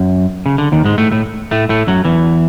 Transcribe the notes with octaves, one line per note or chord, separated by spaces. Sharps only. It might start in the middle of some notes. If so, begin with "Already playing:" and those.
Already playing: F#2
C#3
D3
D#2 D#3
G#2 G#3
A2 A3
A2 A3
A2 A3
A2 A3
F#2 F#3
E2 E3